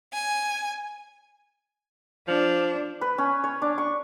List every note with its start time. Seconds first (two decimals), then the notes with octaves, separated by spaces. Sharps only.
0.13 G#5
2.28 F3 D4
3.01 B4
3.18 C#4
3.44 C#5
3.62 D4
3.78 C#6